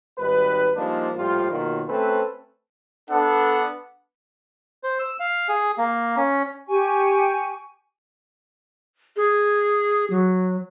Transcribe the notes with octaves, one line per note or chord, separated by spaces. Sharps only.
G#1 G3 D#4 B4
F3 G3 G#3 A#3 D4 D#4
A#1 A2 F3 G3 F4
B1 D#3 F#3 A#3 F4 A#4
A3 C4 C#4 A4 B4
B3 D4 A4 F#5
C5
E6
F5
G#4
A#3
C#4
G4 G#5 C#6
G#4
F#3